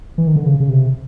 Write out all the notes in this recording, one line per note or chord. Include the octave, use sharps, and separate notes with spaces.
E3
D#3
D3
C#3
C#3
C3